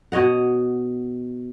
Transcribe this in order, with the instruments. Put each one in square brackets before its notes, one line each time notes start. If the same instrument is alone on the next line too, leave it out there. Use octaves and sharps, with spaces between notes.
[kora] B2 C#5 D#5 F#5